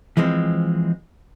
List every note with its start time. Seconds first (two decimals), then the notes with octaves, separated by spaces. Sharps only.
0.17 E3 F3 G#3 C4